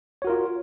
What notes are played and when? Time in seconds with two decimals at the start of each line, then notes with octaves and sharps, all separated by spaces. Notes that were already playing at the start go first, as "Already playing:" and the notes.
0.22 C#5
0.25 F#4
0.27 A#4
0.30 F4